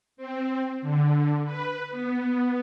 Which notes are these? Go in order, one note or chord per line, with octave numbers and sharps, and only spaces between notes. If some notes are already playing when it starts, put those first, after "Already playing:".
C4
D3
B4
B3